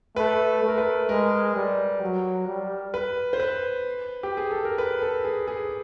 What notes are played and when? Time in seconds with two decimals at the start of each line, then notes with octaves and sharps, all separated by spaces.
0.16 A3 B4
0.62 A3
0.68 A#4
0.78 B4
1.09 G#3 A#4
1.55 G3
2.01 F#3
2.47 G3
2.94 B4
3.33 C5
3.40 B4
4.23 G4
4.37 G#4
4.51 A4
4.65 A#4
4.78 B4
5.02 A4
5.25 G#4
5.47 G#4